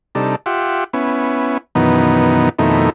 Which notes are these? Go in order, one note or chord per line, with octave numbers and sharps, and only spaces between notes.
C3 G3 D4 D#4 A4
F4 G4 E5 F#5
B3 C#4 E4
F#2 B2 D#3 E3 B3 D#4
F2 B2 D#3 A3 D#4 E4